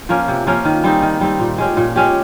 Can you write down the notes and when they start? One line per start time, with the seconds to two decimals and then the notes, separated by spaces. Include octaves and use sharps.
0.09 F3 A#3 C#4
0.28 C3
0.47 F3 A#3 C#4
0.65 D#3
0.84 G3 C4 D#4
1.02 D#3
1.21 G3 C4 D#4
1.40 A#2
1.58 G#3 C#4 G4
1.77 A#2
1.96 G#3 C#4 G4